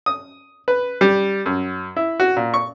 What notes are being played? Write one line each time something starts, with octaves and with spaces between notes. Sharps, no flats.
D#6
B4
G3
F#2
E4
F#4
A#2
C#6